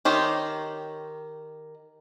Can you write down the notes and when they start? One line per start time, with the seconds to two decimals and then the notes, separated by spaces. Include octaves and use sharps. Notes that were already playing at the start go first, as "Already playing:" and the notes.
0.05 D#3 G4 C5 C#5 D#5